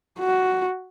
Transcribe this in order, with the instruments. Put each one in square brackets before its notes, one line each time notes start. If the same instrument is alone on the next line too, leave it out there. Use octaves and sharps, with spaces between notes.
[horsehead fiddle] F#4